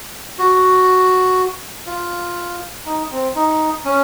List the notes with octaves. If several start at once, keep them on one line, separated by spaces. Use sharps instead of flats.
F#4
F4
D#4
C4
D#4
C#4